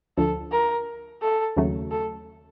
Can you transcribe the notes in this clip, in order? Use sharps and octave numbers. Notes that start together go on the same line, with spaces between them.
D2 D3 F3 A4
A#4
A4
D#2 C#3 F#3 A3
A4